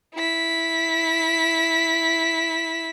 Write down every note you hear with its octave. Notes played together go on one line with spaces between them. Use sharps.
E4 B6